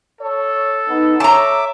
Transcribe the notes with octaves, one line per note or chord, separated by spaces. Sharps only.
A4 C#5
B3 D#4
C#5 E5 A5 A#5 D6